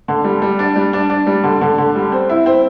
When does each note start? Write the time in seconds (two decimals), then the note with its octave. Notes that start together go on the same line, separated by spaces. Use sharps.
0.08 D3
0.24 G3
0.42 G3
0.59 D4
0.76 G3
0.93 D4
1.10 D4
1.27 G3
1.44 D3
1.61 D3
1.78 D3
1.95 G3
2.12 C4
2.29 E4
2.46 C4